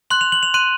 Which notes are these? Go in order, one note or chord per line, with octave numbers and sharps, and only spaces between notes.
C6 F#6 F#7
F7
F#7
F7
C6 F#6 D#7